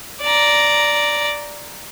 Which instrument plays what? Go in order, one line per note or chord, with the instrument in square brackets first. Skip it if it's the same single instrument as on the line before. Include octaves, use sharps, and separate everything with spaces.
[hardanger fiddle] D5 A#5